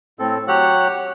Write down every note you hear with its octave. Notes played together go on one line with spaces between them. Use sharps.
A2 C4 A4
F#3 G4 C#5 F#5